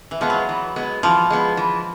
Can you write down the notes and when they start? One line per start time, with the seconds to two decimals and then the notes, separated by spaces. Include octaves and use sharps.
0.11 E3
0.21 F3 G#3 B3
0.30 F#3
0.49 E3
0.76 G#3 B3
1.03 E3 F3
1.30 G#3 B3
1.57 E3